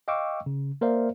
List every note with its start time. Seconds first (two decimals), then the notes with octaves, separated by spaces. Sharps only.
0.08 D#5 F5 G5 C#6 D6 E6
0.46 C#3
0.81 A#3 A#4 C5 D5 E5 F5